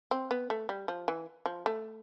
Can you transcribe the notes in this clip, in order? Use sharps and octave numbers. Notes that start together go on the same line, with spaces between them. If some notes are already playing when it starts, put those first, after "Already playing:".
C4
B3
A3
G3
F3
E3
F3
A3